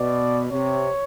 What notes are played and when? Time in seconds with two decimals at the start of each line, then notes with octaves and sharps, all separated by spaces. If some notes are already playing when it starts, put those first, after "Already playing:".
Already playing: B2 D5
0.50 C3 C#5